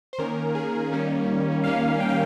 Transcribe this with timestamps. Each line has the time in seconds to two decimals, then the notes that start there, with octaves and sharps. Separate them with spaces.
0.13 C5
0.19 D#3 A#3 C#4 A#4
0.55 G#4
0.92 D#3 G3 A#3 C#4
1.64 D#3 G3 A#3 C#4 F5
2.00 G5
2.09 F5